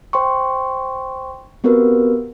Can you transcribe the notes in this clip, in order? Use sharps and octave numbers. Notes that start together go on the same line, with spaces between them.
C5 G5 C6 C#6
B3 C4 F#4 G4 A#4 B4